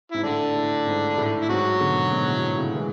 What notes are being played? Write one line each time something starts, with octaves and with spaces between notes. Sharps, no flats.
G#2 E4
A2 D3 D4
A2
G#2
A2
E4
G#2 F#3 F#4
B2 D3
G#2 B2
A2
A2
A2 C#3
E3 G#3